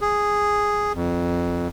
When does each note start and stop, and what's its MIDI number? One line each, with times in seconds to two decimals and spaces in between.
0.01 0.92 68
0.95 1.68 41